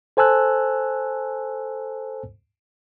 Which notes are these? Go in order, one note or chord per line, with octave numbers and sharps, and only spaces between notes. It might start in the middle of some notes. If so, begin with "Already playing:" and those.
A4 C5 G#5 A5 E6 F#6